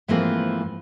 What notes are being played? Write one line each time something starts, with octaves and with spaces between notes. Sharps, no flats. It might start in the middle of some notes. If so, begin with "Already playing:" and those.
G#2 E3 F3 A3 A#3 C4